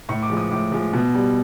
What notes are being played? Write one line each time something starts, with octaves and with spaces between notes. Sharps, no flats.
A2 C#6
D6
F3 G#3
D#6
A2 D6
F3 G#3
B2
G3